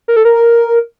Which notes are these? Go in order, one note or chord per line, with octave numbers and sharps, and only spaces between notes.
A#4
A4
A#4